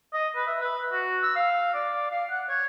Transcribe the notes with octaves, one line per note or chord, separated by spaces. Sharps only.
D#5
B4
E5
B4
F#4
E6
F5
D5
F5
F#5
C#5